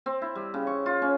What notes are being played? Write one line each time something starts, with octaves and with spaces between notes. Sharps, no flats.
C4
E4
G3
C#3
C#6
F4
C#4